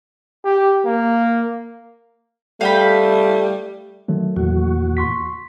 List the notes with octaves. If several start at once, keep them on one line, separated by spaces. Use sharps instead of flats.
G4
A#3
G3 A3 F5 G5 B5
D#3 F#3 A3
E2 A#2 F#4
C6 C#6 B6